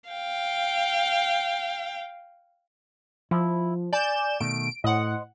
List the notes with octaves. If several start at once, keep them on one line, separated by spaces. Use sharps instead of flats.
F5 G5
F3 E4
D5 G#5 G6 E7
B2 D#3 A3 D7
A2 C5 D#5 F#5